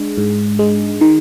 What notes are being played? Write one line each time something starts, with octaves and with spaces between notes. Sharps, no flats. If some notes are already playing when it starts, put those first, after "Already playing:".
Already playing: G#3 D4
G#2
G#3
D#3